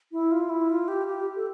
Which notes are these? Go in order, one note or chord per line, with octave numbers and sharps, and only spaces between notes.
E4
F4
E4
F4
G4
G4
A4